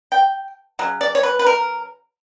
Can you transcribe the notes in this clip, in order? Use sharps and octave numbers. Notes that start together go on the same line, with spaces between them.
G5
C#3 F#3
D5
C#5
B4
B4
A#4